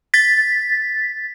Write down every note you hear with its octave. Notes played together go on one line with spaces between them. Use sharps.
A6 B6